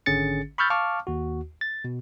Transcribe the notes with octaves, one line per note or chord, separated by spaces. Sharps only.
G#1 D3 C#4 G#4 A6 C#7
B5 C#6 E6 F6 G6 A6
F5 A5 C#6 D6 F6
D#2 F#4
A6
B2